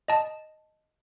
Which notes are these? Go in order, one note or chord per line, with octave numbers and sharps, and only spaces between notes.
D#5 A5